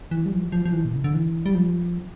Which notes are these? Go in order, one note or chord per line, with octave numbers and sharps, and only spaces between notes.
E3
G3
F3
F3
F3
E3
A#2
C#3
D3
E3
G3
F3